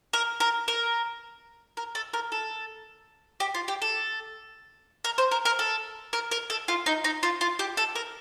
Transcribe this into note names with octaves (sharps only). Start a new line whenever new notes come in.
A#4
A#4
A#4
A#4
A4
A#4
A4
G4
F4
G4
A4
A#4
C5
A#4
A#4
A4
A#4
A#4
A4
F4
D#4
D#4
F4
F4
G4
A4
A#4